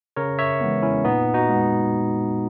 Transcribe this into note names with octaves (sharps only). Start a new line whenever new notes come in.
C#3 A#4 C#5
C#5 E5
E3 G#3 B3
C#4 E4
A#2 B3 D#4
D#4 F#4
G#3 B3